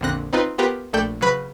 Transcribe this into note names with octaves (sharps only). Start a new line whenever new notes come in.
A#1 F2 D3 C4 F#6 A#6
C4 D#4 F4 B4
B3 F4 G4 A#4 B4
A#1 A3 A4 D5 G5 G6
C#3 F#3 B4 B5